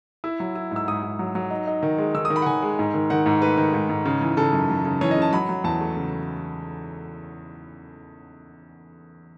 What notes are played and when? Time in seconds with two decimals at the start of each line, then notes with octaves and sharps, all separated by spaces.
0.24 E4 E6
0.40 F#3
0.55 E4
0.71 G#2 E6
0.88 G#2 D#6
1.03 G#2
1.19 F#3
1.35 F#3
1.50 D#4
1.67 D#4
1.83 D#3
1.98 G#3
2.15 D#3 E6
2.25 D#6
2.30 D#3
2.36 B5
2.42 F#5
2.46 D#3 G#5
2.62 G#3
2.79 G#2
2.94 D#3
3.10 D#3 F#5
3.26 G#2
3.42 A3 B4
3.58 D#3
3.74 G#2
3.89 G#2
4.05 C#3
4.21 E3
4.37 C#3 A4
4.53 F#2
4.70 F#2
4.85 C#3
5.01 E3 C#5
5.11 D#5
5.17 C#3
5.22 A5
5.33 F#3 B5
5.49 F#3
5.64 E2 A5
5.81 A3
5.96 C#3